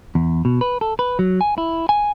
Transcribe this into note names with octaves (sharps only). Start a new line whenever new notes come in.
E2
B2
B4
A4
B4
F#3
G#5
E4
G#5